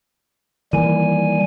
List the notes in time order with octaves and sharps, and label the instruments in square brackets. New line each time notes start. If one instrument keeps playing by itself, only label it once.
[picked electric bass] D#3 E3 A#3 [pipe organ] G3 G#5